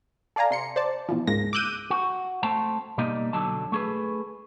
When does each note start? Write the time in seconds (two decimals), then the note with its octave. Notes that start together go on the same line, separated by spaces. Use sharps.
0.36 A4 D5 F5 G#5 A#5
0.51 C3 C6 C#7
0.76 C5 D5 A5
1.09 B2 E3 F3
1.27 C#2 G#2 G#3 A#3 A#6
1.53 D6 E6 F#6 G6 D#7
1.90 F#4
2.43 A3 C4 A5
2.98 B2 G3 A#3 D#4 D#5
3.33 B1 D3 F#3 A5
3.72 A3 G#4 B4